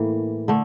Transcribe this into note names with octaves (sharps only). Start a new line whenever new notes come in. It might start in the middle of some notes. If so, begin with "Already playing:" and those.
Already playing: A2 E3 A#3
D3 A3